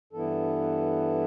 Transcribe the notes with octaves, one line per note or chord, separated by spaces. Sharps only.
G2 E3 B3 E4 A4